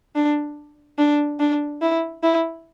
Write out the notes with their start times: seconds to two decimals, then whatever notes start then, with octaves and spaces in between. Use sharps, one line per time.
0.15 D4
0.98 D4
1.40 D4
1.82 E4
2.23 E4